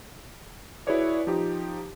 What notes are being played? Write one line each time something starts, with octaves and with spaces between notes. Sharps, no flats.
E4 F#4 G#4 B4 C#5 D5
F3 D#4 G4